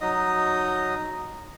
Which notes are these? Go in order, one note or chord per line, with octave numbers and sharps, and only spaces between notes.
F#3 D#4 D#5